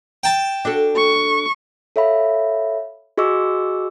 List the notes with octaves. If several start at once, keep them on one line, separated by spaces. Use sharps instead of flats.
G5 A5
D4 F#4 A4
C#6
A4 C#5 E5 F5 B5
F#4 G#4 D#5 C#6 D6 E6